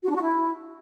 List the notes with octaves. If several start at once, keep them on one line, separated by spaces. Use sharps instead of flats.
F#4
D4
F#4
E4